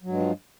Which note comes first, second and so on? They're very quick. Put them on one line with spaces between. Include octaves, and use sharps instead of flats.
F#3 G2 G#3 F3